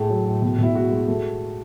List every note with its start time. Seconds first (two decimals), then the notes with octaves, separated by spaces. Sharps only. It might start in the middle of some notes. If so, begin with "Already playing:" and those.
Already playing: A2 A3 G#4
0.10 F#3
0.25 A2
0.42 B2
0.58 B2 E4
0.75 G#3 F#4
0.91 G#3
1.08 A3